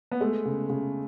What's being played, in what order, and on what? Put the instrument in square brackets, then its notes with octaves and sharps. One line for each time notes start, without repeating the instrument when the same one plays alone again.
[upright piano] B3
[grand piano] G#3 [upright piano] A3
[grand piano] C#3
C#3